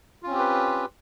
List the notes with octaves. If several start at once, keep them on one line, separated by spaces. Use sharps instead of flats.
C4 C#4 F4 G4 B4